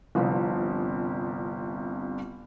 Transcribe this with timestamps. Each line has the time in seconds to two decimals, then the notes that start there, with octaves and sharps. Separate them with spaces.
0.15 G1 C2 G2 C3 F3